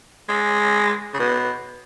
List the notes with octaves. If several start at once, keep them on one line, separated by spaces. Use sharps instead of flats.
G#3
C#3
B2